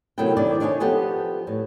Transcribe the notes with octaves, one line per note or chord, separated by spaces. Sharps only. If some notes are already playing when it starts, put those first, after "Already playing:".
C3 D#3 F#3 A3 E4 G5
D#3 F3 A3 D4 E4 D5
D4 D#4 C#5 G5 G#5
F3 B3 G4 A4
A2